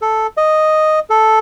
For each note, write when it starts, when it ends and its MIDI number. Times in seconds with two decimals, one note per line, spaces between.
0.02 0.27 69
0.37 0.99 75
1.10 1.39 69